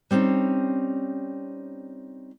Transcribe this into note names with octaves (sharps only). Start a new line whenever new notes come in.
G3 C4 C#4 D#4